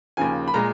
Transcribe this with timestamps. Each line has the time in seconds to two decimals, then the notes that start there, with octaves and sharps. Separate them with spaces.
0.17 D#2 C#3 F3 G#5
0.48 B5
0.54 A#2 G#3 A#5